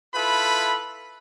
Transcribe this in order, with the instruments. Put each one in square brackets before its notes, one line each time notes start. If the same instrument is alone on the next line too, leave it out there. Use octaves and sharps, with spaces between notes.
[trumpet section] E4 F4 A4 B4 B5